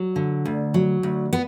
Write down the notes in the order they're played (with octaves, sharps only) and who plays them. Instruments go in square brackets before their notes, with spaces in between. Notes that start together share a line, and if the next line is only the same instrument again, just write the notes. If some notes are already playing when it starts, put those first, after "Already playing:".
Already playing: [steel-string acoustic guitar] F#3
D3
D2
F#3
D2
B3